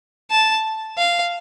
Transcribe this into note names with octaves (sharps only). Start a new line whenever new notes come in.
A5
F5